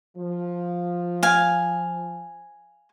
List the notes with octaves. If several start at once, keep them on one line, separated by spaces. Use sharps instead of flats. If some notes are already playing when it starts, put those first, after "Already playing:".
F3
F5 G#5